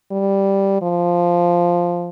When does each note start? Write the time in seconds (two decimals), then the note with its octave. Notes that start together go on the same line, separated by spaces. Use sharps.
0.11 G3
0.82 F3